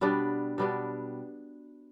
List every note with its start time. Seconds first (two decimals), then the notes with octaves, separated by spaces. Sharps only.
0.01 B2 G3 B3 D4
0.58 B2 G3 B3 D4